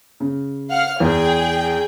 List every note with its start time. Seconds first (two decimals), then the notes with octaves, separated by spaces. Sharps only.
0.20 C#3
0.70 F5 F#5 F6
1.00 E2 G#4 G5